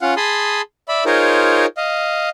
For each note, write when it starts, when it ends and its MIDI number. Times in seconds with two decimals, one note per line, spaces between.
0.01 0.14 61
0.01 0.14 65
0.01 0.14 77
0.01 0.14 78
0.17 0.62 68
0.17 0.62 81
0.17 0.62 83
0.17 0.62 84
0.17 0.62 87
0.88 1.04 74
0.88 1.04 76
0.88 1.04 83
1.06 1.66 63
1.06 1.66 65
1.06 1.66 68
1.06 1.66 70
1.06 1.66 72
1.06 1.66 73
1.77 2.29 75
1.77 2.29 77